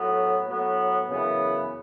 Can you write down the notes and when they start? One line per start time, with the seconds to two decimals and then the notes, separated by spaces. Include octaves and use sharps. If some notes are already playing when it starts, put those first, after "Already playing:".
Already playing: A2 F#3 B3
0.48 A2 F#3 B3
1.10 F#2 C#3 E3 B3